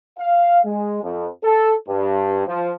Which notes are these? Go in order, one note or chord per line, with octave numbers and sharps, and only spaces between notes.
F5
G#3
F2
A4
G2
F3